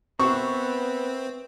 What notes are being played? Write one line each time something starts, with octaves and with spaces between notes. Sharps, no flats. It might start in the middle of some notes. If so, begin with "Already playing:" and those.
B3 C4 A#4 B4 E5 C#6